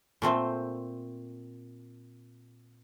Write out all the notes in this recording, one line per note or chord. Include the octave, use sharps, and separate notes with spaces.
A#2 A3 C4 C5